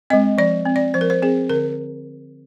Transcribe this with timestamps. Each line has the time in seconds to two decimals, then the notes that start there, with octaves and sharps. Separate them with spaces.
0.10 G#3 C4 D#5
0.38 F3 D5
0.65 C4
0.76 D5
0.94 F3 C5
1.01 A#4
1.10 C5
1.22 C4 G#4
1.49 D3 A#4